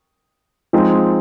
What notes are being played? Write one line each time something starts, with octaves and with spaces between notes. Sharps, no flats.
F3 G#3 C4 D#4